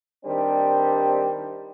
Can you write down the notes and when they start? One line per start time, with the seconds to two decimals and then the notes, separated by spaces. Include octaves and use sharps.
0.25 D#3 G3 C4 D4 G4